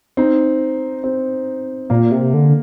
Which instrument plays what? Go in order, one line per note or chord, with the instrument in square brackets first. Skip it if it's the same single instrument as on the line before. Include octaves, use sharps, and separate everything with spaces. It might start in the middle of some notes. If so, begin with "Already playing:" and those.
[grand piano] C4 D#4
C4
[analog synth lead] A#2 [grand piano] A#3
[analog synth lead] C3
D3